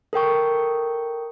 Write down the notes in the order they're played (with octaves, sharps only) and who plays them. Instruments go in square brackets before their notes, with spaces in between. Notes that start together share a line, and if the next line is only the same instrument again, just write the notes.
[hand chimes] A4 A#4 G5 C#6